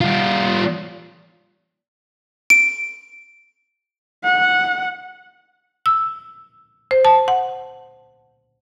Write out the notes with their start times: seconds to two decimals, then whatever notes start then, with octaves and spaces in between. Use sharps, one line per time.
0.01 G3 F4
2.50 D7
4.24 F#5
5.86 E6
6.91 C5
7.05 A5
7.28 F#5